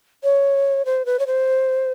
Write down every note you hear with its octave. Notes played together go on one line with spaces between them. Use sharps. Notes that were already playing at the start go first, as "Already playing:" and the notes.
C#5
C5
B4
C#5
C5